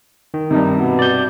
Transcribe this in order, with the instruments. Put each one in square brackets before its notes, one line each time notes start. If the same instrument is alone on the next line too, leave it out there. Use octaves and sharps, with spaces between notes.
[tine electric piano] D#3
[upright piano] G2 C3 [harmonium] D#4
[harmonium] B2 B3
[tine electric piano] D5 G6